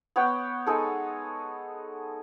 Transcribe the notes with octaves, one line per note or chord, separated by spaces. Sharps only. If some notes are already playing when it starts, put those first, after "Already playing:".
B3 C#5 F#5 G5
G#3 D#4 G#4 A4